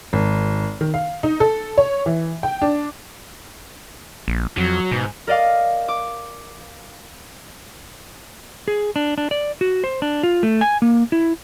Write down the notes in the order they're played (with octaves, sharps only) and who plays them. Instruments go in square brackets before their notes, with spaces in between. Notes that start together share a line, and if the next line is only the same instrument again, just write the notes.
[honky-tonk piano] G#1
D#3
F5
D#4
A4
C#5
E3
G5
D4
[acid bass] A#1
[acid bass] F2 [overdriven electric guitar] F#3
[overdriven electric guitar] G#2 [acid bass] B2
[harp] A#4 D5 D#5 F5 D6
D6
[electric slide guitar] G#4
D4
D4
D5
F#4
C5
D4
F4
A3
G#5
A#3
E4